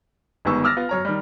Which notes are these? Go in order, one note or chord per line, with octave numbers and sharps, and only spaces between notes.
G1 D#3 G#3 B3 C#6 E6
D6 E6 F6 A6 A#6
B3 F4
F#2 C#5 A#5
D#3 G3